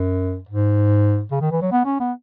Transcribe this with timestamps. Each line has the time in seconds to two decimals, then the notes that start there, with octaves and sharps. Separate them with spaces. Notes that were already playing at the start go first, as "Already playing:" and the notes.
Already playing: F#2
0.49 G#2
1.31 C#3
1.41 D#3
1.51 E3
1.62 F#3
1.72 B3
1.85 C#4
2.00 B3